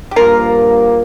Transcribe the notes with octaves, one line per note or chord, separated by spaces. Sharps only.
G4
G2 F3 A#3 F4 A#4